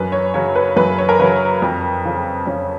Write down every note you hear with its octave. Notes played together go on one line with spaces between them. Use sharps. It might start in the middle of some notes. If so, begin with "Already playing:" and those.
Already playing: F#2 B4
C#5
C#3 F#3 C#5
B4
F#2 B4
C#5
A#4
C#3 F#3 B4
F2
C#3 F3
F2 C#4